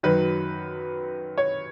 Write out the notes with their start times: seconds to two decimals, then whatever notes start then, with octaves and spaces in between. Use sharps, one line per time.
0.03 F#2 D#3 F#3 B4
1.38 C#5